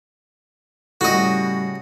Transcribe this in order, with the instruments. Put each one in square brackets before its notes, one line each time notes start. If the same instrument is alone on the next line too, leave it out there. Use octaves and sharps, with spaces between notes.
[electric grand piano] A2 C#3 G3 [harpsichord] F#4 D#5